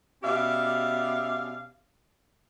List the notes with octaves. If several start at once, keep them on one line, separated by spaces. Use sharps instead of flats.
B2 C#4 G4 D5 E5 F5